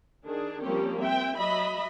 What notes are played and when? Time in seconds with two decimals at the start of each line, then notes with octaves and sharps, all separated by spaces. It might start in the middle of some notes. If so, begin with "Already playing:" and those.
0.24 D#3 D4 G#4
0.62 F3 G3 A#3 C4 C#4 G4
1.00 C4 E5 G5
1.37 F#3 D#5 E5 B5